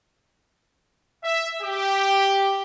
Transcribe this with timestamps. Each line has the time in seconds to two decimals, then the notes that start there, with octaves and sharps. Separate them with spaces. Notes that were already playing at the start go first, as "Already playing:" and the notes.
1.24 E5
1.62 G4